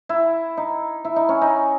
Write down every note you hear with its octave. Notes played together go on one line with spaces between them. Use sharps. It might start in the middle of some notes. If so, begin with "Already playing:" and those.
E4
D#4
E4
D#4
C#4
D#4